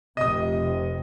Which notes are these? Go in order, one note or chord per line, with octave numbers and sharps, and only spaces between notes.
F1 C3 D#5 D#6